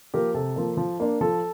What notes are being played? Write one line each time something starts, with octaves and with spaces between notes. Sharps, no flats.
F3 A#3 G4 A#4
C3 A4
F3 A#3
F3
A#3 D4
F3 A4